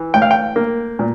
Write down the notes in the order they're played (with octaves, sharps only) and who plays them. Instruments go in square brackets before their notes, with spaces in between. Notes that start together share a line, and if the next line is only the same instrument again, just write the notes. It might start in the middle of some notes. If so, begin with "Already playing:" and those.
Already playing: [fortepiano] E3
A2 G5
F5
G5
A#3
A#2